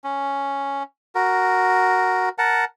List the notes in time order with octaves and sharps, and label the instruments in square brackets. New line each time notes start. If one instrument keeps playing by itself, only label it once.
[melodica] C#4
F#4 A#4
A#4 F#5 A5